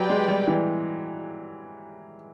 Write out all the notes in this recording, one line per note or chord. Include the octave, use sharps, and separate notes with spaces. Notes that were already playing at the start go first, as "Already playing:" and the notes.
Already playing: F#3 G4 B4 D5 G5
G#3
G3
E3